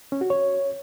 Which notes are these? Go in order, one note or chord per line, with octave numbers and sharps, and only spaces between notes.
C#4
F#4
C#5